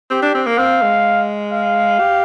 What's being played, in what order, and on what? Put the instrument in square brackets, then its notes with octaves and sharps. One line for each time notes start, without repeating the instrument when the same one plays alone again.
[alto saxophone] C4 [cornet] G4
[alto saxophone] D4
C4
A#3
[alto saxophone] C4 [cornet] F5
[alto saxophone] G#3
[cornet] F5
[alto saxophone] G4